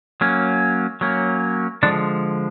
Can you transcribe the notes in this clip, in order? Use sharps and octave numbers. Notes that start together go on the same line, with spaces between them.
F#3 A#3 C#4
F#3 A#3 C#4
D3 F3 G#3 D4